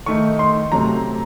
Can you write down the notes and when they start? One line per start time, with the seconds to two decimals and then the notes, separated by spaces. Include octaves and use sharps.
0.06 D#3 A3 D#4 C#6
0.39 C6
0.72 C3 F#3 A3 C4 A#5